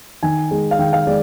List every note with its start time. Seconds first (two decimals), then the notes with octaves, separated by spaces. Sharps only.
0.23 D#3 G#5
0.51 G#3
0.71 F5
0.79 D#3 G5
0.93 F5
1.07 G#3 D5